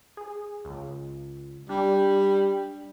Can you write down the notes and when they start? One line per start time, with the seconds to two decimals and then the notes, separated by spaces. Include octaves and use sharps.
0.17 G#4
0.65 C#2
1.69 G3 D4